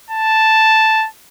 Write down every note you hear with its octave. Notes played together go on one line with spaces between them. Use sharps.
A5